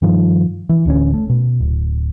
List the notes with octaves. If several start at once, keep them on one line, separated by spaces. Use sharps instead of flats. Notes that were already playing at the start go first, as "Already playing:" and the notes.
G2 D#3 F3
E3
D1 D3 C4 C#4
A3
B2
D1